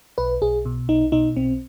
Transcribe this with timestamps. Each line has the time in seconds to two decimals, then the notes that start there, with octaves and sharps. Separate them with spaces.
0.18 B1 B4
0.42 B1 G#4
0.65 B2
0.88 B1 D#4
1.12 B2 D#4
1.36 B1 C4